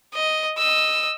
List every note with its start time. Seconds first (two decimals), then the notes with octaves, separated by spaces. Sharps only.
0.14 D#5
0.58 D#5 E6